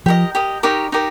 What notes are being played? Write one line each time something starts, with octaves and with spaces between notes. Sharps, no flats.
F3 G4 A#4 D#5
G4 A#4 D#5
D#4 G4 A#4 C#5
D#4 G4 A#4